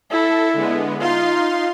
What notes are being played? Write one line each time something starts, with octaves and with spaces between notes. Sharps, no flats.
E4 A4
D3 G#3 B3
D#4 F4 F5 C6